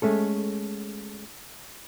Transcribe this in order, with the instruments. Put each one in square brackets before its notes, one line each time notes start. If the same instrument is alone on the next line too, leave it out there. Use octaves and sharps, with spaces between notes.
[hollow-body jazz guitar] G#3 A3 C#4 A4